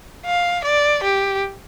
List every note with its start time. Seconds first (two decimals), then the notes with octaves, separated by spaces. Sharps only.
0.26 F5
0.64 D5
1.03 G4